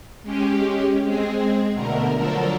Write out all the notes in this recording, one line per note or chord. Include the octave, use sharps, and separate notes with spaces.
G#3 C#4 G4
G#3 C4 G#4
B2 D3 A3 A#4
D3 F3 F#3 A4 A#4